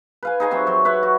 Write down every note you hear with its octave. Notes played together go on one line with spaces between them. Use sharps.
B4 F5 G#5
D#4 G#4 D#5 G#5
F#3 C4 G4 E5
F#3 C#5 C6
B4 C#5 E5 F#5
F#4